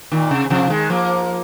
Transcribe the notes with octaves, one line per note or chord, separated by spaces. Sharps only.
A#2 D#3
C3
C3 F3
D#3 G#3
F3 A#3